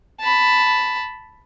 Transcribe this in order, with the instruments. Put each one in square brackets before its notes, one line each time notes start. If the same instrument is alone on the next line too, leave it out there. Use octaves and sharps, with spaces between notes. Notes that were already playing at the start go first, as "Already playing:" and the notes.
[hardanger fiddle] A5 B5